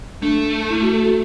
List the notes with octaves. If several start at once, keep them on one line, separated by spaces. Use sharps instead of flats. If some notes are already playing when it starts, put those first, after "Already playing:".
A3 D4
E4
F#4
A4
F#4